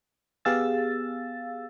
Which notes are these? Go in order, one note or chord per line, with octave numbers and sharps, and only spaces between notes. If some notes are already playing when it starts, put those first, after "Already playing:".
B3 G4 G#4 F5 E6 A6